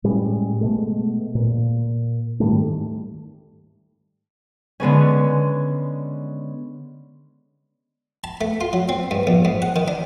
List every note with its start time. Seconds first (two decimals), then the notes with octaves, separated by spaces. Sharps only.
0.04 A2 G3 G#3 C#4
0.61 B2 G#3 A3
1.35 A#2
2.40 G#2 D#3 G3 A3
4.80 D3 G#3 B3 C#4
8.24 A5
8.41 A3
8.61 F4
8.73 F#3
8.89 C4
9.11 G2
9.27 A#1
9.45 G#2
9.62 F#5
9.76 D#3
9.88 D4